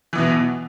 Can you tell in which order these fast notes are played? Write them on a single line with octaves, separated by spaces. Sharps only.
E3 B3 B2